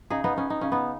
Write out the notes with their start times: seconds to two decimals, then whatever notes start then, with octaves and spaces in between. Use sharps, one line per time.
0.10 C#3 D#4 G#4
0.24 B3 D#4
0.37 B3 C#4
0.50 D#4
0.61 C#3 C#4
0.72 B3 D#4